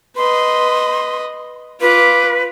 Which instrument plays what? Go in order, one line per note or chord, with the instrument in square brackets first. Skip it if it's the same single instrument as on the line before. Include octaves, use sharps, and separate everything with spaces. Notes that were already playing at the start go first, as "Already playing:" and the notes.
[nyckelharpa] B4 D#5 [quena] C6
[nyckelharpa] F4 D6 [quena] B4